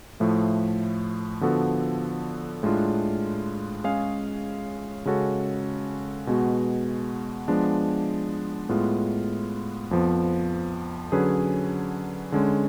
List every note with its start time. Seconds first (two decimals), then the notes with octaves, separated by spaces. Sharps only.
0.20 A2 F3 A3
1.41 D3 F3 B3 F#4 A4
2.63 A2 G#3 D4 F4
3.84 G#3 C#4 G#4 C#5 F5
5.05 C#3 G#3 C#4 F#4 A4
6.27 B2 G#3 B3 F#4
7.48 F3 G#3 B3 D4
8.69 A2 G#3 B3 F4
9.91 F2 F3 B3
11.12 D3 F#3 C#4 G#4 B4
12.32 D3 G#3 C#4